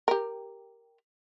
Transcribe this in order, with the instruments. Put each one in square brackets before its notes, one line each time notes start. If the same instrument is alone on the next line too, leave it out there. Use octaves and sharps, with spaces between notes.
[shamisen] G4 A#4